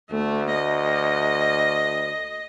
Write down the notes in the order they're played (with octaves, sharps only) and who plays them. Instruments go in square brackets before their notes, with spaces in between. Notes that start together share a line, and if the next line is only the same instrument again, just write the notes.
[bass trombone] D2 [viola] A3
[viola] D#5